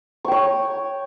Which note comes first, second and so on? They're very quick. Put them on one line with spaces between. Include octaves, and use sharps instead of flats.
C#6 G5 C#5